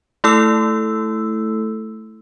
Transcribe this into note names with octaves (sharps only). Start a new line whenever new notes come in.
A3 E4 A4 E6